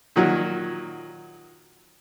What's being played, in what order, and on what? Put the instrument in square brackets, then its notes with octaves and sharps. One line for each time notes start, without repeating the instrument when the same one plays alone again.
[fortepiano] A#2 D#3 F#3 F#4